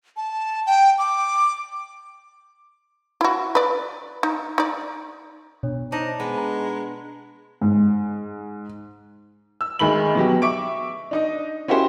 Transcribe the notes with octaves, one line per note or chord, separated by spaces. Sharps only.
A5
G5
D6
E4 F#4
B4 D5
D#4
D#4 D5
B2 D4 C#5
D4 D#4 C5 A#5 A#6
G#3 B3 G#5
A#5
G#2
E6
D2 D#3 G#3 B5 F#7
B2 F#3 G4
E5 C#6 D6 D7
D4 D#4 D#5
C#4 E4 F#4 G4 C5